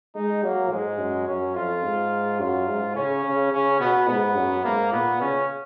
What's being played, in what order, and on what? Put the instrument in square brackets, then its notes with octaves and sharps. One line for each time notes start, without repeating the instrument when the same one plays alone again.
[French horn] G#3 [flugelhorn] D#4
[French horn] F#3 [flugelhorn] A#3
[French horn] G#2 [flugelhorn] G#3
[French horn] F#2
[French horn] F#2 [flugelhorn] C#4
[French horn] F2 [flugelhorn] F4
[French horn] G#2
[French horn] F#2 [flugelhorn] F4
[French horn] G#2
[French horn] C#3 [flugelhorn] C#4
[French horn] C#3
[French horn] C#3 [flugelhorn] C#4
[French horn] B2 [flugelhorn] B3
[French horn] G#2 [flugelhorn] B3
[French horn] F#2
[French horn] G#2 [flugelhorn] A#3
[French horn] A#2 [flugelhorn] B3
[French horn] C#3 [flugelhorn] C#4